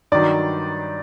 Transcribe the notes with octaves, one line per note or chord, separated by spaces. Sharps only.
G2 D#3 F#3 D5